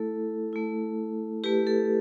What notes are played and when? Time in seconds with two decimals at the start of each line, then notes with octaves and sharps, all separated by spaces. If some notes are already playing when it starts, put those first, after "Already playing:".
Already playing: A3 E4 A4
0.53 A3 E4
1.44 A3 E4 G4 B4
1.67 A4